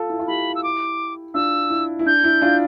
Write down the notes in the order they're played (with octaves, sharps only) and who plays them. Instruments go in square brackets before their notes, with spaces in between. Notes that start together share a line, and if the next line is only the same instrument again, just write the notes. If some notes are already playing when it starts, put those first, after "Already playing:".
Already playing: [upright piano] F4 A4
E4
F4
[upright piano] E4 G4 [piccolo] B5
[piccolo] E6
D6
[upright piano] D4 F4 [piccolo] E6
[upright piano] E4
E4
[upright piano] D4 [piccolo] G6
[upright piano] E4
D4 F4